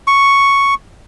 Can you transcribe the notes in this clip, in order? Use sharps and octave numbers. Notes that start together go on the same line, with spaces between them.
C#6